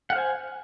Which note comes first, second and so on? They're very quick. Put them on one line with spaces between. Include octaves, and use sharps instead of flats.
F#5 F5 C5 G#5